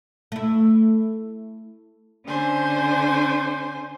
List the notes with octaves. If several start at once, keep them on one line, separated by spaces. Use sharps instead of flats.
A3 E4
D3 C#4 D4 C5 G#5 C6